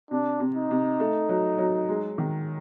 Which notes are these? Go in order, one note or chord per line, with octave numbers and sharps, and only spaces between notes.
C3 D4
C3
D#4
C3
A3
F#3
F#3
G#3
D#3